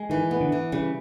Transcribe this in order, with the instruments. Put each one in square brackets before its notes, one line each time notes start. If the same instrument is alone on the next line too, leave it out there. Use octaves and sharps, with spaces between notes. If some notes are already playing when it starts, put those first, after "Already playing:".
Already playing: [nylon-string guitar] G#3
[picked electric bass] D#3 [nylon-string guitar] E3
[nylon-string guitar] B3
[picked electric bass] D3
[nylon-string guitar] E3
[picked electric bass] C#3 [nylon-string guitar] G3